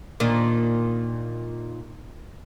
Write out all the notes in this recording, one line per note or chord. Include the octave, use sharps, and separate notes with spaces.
A#2 D#3 D4